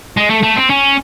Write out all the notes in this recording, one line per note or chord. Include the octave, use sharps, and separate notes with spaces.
G#3
A3
A3
C4
C#4